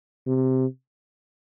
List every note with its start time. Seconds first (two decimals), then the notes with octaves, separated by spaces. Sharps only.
0.27 C3